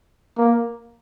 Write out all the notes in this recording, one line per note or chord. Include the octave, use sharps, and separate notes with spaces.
A#3